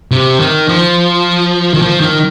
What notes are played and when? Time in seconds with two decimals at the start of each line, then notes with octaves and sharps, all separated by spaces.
0.12 C3
0.40 D#3
0.69 F3
1.75 D#3
1.82 F3
2.01 D#3